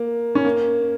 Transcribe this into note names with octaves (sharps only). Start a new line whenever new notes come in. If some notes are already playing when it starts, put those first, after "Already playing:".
Already playing: A#3
C#4
A#3